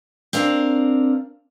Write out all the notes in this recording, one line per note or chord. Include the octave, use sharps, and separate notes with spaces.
C4 D4 A#4 F5